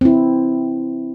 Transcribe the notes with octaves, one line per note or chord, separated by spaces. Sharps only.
C4 E4